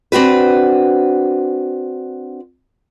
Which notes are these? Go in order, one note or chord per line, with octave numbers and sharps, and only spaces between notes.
C4 D4 F#4 B4